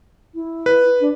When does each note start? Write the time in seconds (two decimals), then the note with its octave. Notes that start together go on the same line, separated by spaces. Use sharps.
0.34 E4
0.66 B4
1.01 D4